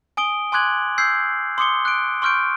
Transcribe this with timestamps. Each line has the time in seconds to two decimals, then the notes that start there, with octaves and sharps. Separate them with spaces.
0.17 G#5 D#6 D7 G7
0.52 G#5 C6 D6 F#6 G#6 F#7
0.98 E6 G6 G#6 C7
1.58 C6 D6 D#6 C#7 G7
1.85 F#6 D7
2.22 C6 C#6 F6 G6 D7